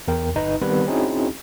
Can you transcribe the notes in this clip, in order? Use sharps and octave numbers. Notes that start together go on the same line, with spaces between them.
E2 A#4 G5
G1 D#4 B4 A#5
D#3 G3 B3 C4 G4 B4
C4 C#4 D#4 E4 F#4 G#4